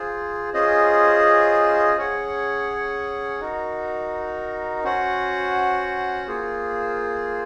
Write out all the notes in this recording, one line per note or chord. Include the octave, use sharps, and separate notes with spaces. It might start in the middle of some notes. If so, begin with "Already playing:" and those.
Already playing: F4 G#4 C5
C#4 F4 G#4 C5 D#5
C#4 G#4 C#5 F#5
D#4 F#4 A#4
C#4 F#4 C5 F#5
A#3 F4 G#4 C5